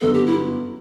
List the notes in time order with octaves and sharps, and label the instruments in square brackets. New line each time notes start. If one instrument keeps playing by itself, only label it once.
[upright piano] G1 F#2 F#3 B3 [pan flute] A4
[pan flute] G4
E4